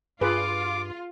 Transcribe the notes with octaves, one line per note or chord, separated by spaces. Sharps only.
G2 F4 G#4 B4 D6